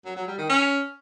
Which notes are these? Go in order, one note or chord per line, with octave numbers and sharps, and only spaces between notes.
F#3
F#3
G3
D#3
C#4